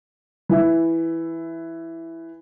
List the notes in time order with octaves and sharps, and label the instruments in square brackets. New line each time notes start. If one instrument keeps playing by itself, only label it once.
[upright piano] E3 E5